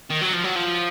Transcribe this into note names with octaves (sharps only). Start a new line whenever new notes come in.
D#3
F#3
F3
F#3
F3